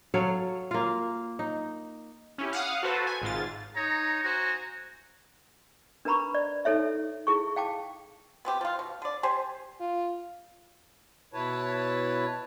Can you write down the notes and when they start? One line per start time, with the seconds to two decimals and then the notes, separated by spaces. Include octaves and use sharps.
0.14 F#3 A4 C#5 F5
0.71 A#3 F4
1.39 D#4
2.38 C#4 E4 G4
2.53 F5 F#5 D#6
2.83 F#4 A4 B4 C5 F#5 A5
3.07 G#5
3.22 G#1 G#2 F4 A6
3.75 D#4 C#5 A#5
4.23 F#4 C5 G#5 A#5
6.05 D4 A#4 B4 A#5 B5 C#6
6.35 D5
6.65 D#4 A4 C#5 E5
7.27 E4 G#4 C#6
7.56 F5 G5 A5 D6
8.45 B3 C4 G4
8.61 F3 F4
8.79 B2
9.02 D3 D5
9.23 G4 C5 G#5
9.80 F4
11.34 B2 E4 B4 C#5 A5